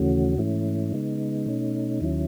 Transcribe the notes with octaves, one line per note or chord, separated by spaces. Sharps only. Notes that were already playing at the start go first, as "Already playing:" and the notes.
Already playing: D#2 C#3 E3 A3 C#4 F#4
G#2 E3 A3 C#4 E4
C#3 G#3 B3 D#4
B2 A3 C#4
D#2 D#3 F#3 C#4 E4